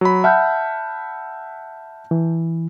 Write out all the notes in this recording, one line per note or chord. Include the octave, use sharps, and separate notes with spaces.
F#3 F#4 B5
E5 F#5 A5 B5 F6 G6
E3